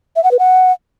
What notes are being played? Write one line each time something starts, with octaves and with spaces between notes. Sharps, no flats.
E5
F#5
B4
F#5